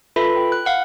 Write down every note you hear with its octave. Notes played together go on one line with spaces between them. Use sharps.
F4 A4 B4 E5 B5
G5
F#6
F5 F#5 F#6